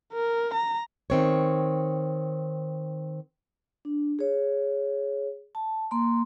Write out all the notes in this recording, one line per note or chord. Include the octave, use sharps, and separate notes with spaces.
A#4
A#5
D#3 C4 C#5
D4
G#4 C#5
A5
A#3 A#5 C6